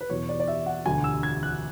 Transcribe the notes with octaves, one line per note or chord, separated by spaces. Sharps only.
B4
E2 B2 F#3 C#5
D5
D5
E5
F#5
E1 D2 D3 F#3 G#5
E6
G#6
F#6